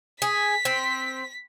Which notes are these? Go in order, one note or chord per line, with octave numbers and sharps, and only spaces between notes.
G#4 B6
C4